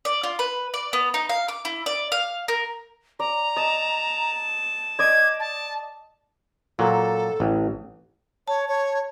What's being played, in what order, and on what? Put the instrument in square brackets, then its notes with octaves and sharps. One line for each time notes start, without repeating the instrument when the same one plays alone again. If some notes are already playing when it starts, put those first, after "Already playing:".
[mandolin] D5
F4
B4
D5
B3
D#4
F5
D6
E4
D5
F5
A#4
[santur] D5 [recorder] A#5
[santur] D#5 [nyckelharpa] A5
[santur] D5 D#5 [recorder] G#6
[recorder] A5
[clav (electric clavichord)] A#2 F#3 [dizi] A4
[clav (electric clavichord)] A1
[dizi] C#5 [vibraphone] A5
[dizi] C#5